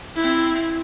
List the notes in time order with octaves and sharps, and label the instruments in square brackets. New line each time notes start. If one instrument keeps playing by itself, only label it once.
[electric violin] C4 E4